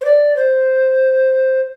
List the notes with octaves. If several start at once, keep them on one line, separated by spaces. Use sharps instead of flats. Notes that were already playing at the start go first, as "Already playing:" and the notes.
C5
D5
C5